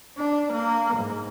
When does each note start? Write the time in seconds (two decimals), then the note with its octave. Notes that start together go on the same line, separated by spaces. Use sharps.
0.18 D4
0.52 A#3
0.96 G#2